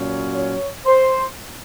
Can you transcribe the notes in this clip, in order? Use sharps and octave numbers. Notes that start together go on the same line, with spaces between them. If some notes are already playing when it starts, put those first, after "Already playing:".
Already playing: A#2 F#3 C#4
C#5
C5